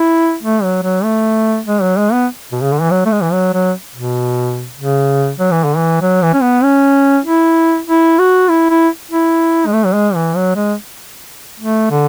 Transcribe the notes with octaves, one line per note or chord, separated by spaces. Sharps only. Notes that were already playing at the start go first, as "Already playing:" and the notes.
Already playing: E4
A3
F#3
F#3
A3
G#3
F#3
G#3
B3
B2
C#3
D3
E3
F#3
A3
G#3
E3
F#3
F#3
B2
C#3
F#3
E3
D3
E3
F#3
E3
C#4
B3
C#4
E4
E4
F#4
E4
E4
E4
G#3
A3
F#3
G#3
E3
F#3
G#3
A3
D3